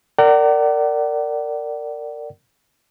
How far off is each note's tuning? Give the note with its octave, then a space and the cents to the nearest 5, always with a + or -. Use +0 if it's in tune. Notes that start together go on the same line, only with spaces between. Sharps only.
A#4 -25 D5 +0 F#5 +40